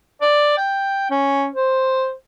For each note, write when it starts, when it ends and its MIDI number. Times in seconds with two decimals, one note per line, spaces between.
0.21 0.55 74
0.57 1.09 79
1.11 1.48 61
1.53 2.13 72